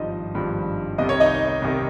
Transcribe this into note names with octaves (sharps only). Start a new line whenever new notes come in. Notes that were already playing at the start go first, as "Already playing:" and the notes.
Already playing: G#1 G2 F3 D#4 D#5
G#1 G2 F3
C2 C3 D#3 D#5
C#5
D#4 D#5
C2 C3 D#3